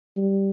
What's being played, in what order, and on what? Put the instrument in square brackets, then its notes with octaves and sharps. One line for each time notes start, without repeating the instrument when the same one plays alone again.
[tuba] G3